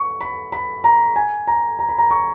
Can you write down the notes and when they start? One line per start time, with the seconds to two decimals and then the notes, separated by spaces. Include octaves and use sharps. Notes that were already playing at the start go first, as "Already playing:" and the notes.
Already playing: C#6
0.21 B5
0.52 B5
0.84 A#5
1.16 G#5
1.47 A#5
1.79 A#5
1.89 B5
1.98 A#5
2.11 C#6